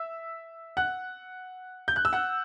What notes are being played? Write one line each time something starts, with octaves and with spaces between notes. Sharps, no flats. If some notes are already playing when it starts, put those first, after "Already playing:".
Already playing: E5 E6
F#5 F#6
G6
F#6
E6
F#5 F#6